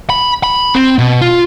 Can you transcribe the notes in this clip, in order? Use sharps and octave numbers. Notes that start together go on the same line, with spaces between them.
B5
B5
C4
B2
F4